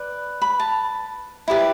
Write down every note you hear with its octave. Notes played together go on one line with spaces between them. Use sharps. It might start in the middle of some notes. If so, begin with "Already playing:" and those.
Already playing: B4 D5
B5
A5
E4 G4 B4 D5